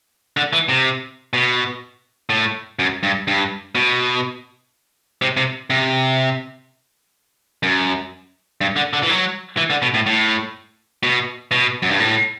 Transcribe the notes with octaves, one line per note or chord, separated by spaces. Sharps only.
D3
E3
C3
B2
A2
F#2
G2
G2
B2
C3
C3
C3
F#2
G2
D3
D3
E3
F#3
E3
D3
B2
A2
A2
B2
B2
F#2
G2
A2